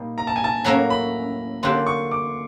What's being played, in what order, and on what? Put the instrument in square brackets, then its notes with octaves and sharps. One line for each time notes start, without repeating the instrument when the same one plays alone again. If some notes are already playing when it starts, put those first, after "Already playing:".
Already playing: [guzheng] A#2 G3 A#3 D#4
[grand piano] A#5
A5
G#5
A5
[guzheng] A2 F#3 A#3 C#4 E4 [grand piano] A#5
[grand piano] B5
[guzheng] D3 F#3 A#3 D4 G4 [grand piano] C6
[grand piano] C#6
D6